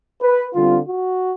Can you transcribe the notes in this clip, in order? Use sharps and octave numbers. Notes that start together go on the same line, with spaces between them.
B4
D3 G3 C4 F4
F#4